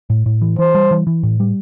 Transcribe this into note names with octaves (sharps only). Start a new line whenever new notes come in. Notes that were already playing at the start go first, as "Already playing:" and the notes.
A2
A2
E3
E3 C5
G3
E3
E3
A2
G3